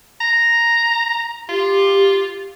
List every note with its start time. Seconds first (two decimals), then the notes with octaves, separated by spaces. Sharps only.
0.21 A#5
1.49 F4 G4